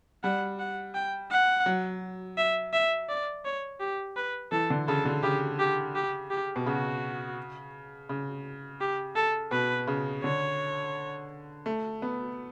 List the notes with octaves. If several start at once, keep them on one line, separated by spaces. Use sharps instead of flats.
G3 F#5
F#5
G5
F#5
F#3
E5
E5
D5
C#5
G4
B4
E3 A4
D3
C#3 A4
D3
C#3 G4
G4
G4
G4
B2
C#3 F#4
C#3
G4
A4
B2 B4
C#3
D3 C#5
A3
B3